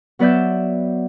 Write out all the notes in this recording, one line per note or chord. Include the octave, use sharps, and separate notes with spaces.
F#3 B3 B4 D5 E5 G6